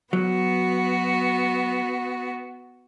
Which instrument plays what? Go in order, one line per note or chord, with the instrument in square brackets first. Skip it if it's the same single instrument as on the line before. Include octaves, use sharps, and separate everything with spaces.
[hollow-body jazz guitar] F#3 [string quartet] B3 F#4